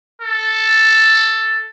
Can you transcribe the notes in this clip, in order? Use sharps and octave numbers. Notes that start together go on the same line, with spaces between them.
A4